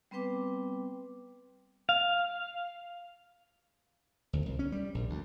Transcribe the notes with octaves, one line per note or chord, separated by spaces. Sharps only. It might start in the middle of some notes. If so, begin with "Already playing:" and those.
G3 B3 C4 B4 G5 D6
F5
D2
C2
C#4
G3
A#1
D2